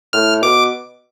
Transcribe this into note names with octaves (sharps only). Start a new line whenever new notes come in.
A2 F6
B2 D6